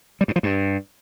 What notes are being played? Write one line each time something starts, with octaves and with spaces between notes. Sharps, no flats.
G3
G2
F3
G2